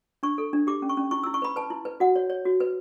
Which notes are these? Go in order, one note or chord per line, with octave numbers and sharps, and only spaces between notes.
D4 C#6
A4
D4
G4 D6
C#4
C#6
C#4
E4 C#6
E4 E6
C#6
B4 B5
B4 A5
E4
B4
F#4 F#5
C#5
C#5
F#4
B4